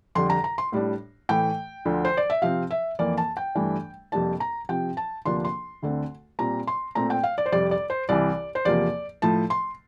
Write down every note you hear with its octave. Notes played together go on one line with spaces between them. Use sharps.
F2 D3 G3 C6
A#5
A#5
C6
A2 G3 D4
A2 E3 A3 G5
D2 D3 F3
C5
D5
E5
C3 F3 C4 F5
E5
F2 E3 A#3 D5
A5
G5
G2 E3 A3 D4
F2 C3 G3 A#3 D4 A5
A#5
C3 F3 C4 G5
A5
D2 C3 F3 A#3 D4 C6
C6
D2 D3 A3 C4
A#2 G3 C4 A#5
C6
A#2 A3 C4 A#5
G5
F5
D5
C5
F2 C3 G3 D5
D5
C5
C2 C3 E3 D5
C5
E2 C3 F3 A#3 D5
A2 F3 A3 A5
C6